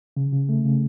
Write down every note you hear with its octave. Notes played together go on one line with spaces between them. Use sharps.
C#3
C#3
A3
C#3